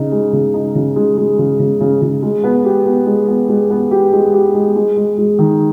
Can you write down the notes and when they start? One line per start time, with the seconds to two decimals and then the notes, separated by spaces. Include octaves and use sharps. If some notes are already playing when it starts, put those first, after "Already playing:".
Already playing: C#3 D#4
0.12 G#3
0.33 C#3
0.54 D#4
0.75 C#3
0.96 G#3
1.17 G#3
1.39 C#3
1.59 C#3
1.80 C#3
2.02 C#3
2.22 G#3
2.44 B3
2.65 G4
2.86 B3
3.06 G#3
3.28 B3
3.49 G#3
3.70 B3
3.91 G4
4.13 G#3
4.33 G4
4.54 G#3
4.76 G#3
4.97 G#3
5.18 G#3
5.39 D#3